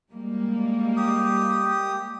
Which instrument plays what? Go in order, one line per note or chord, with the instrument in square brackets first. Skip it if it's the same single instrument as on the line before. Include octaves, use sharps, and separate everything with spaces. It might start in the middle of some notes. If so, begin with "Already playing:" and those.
[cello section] G3 G#3 A#3
[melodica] G4 D#6